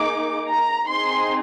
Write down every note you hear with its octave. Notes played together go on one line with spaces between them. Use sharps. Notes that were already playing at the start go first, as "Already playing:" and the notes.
Already playing: A#3 D#4 G#4 D6
A#5
C4 D#4 G#4 C6